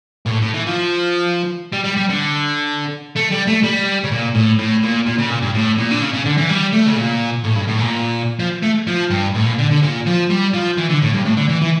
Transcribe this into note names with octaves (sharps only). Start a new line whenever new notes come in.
A#2
A2
A2
E3
F3
G3
G3
G3
D3
A3
G3
A3
G3
C#3
A#2
A2
A2
A#2
A#2
C#3
A#2
G2
A2
A#2
D3
C#3
C#3
D3
E3
G3
A3
C#3
A#2
A2
G2
A2
A#2
F3
A3
F3
G2
A2
A#2
D3
D3
A#2
F3
G3
F3
E3
D3
A2
G2
A2
D3
E3
E3